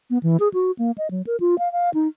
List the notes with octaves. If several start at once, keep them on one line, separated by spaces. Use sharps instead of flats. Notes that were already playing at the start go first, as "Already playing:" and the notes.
B3
E3
G#4
F#4
A#3
D#5
F#3
A#4
F4
F5
F5
D#4